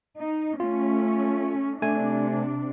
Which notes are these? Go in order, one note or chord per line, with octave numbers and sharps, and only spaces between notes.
D#4
A3 C#4 F4
C3 A3 D4 G#5